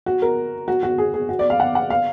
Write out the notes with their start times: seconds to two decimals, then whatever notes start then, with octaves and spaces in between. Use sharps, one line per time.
0.06 F#4
0.22 A#4
0.68 F#4
0.83 F#4
0.98 G#4
1.14 G#4
1.29 F#4
1.39 D5
1.50 F5
1.60 F#5
1.75 F#5
1.90 F5